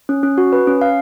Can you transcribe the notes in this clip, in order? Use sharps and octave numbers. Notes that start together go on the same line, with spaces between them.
C#4
C#4
F#4
B4
C#4
F5